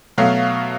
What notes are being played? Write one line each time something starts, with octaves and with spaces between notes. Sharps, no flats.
B2 F#3 A3 F5